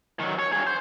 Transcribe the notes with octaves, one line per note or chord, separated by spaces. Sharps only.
D#3 F#3
C#5
G2 G#4
C5